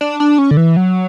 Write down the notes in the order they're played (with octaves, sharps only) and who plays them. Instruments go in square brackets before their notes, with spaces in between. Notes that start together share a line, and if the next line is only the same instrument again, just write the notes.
[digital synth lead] D4
D4
C#4
D3
E3
F#3